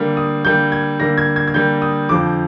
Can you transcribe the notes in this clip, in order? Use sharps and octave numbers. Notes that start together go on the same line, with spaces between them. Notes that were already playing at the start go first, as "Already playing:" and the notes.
Already playing: D3 G3 A#3
D#6
D3 G3 A#3 G6
G#6
D3 G3 A#3 A#6
G#6
G#6
G#6
D3 G3 A#3 G6
D#6
F2 D3 F3 D6